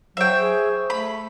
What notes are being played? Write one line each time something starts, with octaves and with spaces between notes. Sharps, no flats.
F#3 C5 E5 G5 C#6
G#4
A3 B5